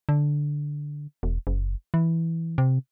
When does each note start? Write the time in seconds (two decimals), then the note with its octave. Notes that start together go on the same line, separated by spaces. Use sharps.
0.09 D3
1.23 E1
1.47 F#1
1.94 E3
2.58 C3